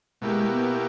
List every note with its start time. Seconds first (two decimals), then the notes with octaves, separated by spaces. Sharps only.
0.21 B2 G#3 A#3 E4 G4
0.50 B3